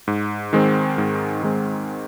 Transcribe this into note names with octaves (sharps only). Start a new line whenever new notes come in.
G#2
D#3 G#3 C4
G#2
D#3 G#3 C4